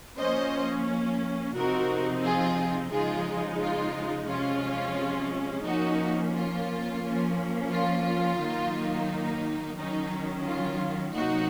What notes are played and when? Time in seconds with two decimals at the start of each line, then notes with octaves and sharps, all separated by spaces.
0.18 F3 A#3 C#4 C5 D#5
1.54 C3 F3 C4 D#4 F#4 A#4
2.23 F4 G#4
2.91 C#3 F3 G#3 D#4 F4 G#4
3.60 F4
4.29 C3 F3 G#3 C#4 F4
5.66 F3 A#3 C#4 D#4 F#4
6.34 F4
7.03 F3 A#3 C#4
7.71 F4
8.40 D#3 F#3 A#3 D#4
9.77 D#3 F#3 C#4 D#4
10.46 F4
11.14 C3 F#3 A#3 D#4 F#4